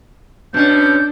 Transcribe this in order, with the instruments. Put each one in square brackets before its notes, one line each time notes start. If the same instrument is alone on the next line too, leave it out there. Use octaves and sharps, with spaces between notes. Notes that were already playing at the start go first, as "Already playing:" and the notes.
[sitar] B2 C#4 [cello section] D4 [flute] G6